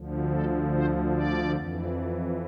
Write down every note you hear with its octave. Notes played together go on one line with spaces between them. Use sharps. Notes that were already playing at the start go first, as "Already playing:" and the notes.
Already playing: D2 D3 F3
A4
C5
D5
F2 E3